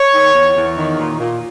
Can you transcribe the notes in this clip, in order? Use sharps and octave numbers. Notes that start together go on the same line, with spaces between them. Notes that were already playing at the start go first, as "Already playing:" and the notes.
Already playing: C#5
D#3
E2
E2
D#3
A#2
A#2